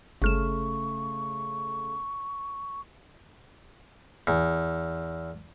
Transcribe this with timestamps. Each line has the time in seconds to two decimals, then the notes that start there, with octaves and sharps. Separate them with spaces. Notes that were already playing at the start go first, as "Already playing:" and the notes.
0.22 G1 C#3 A3 C#6 F6 E7
4.27 E2